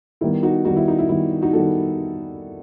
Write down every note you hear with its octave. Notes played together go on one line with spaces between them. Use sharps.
D#3 G3 B3 E4
D#4 F#4
D#3 G3 B3 D#4 F#4
E4
D#4
E4
D#3 G3 B3 E4
D#4 F#4
D#3 G3 B3 F#4 A4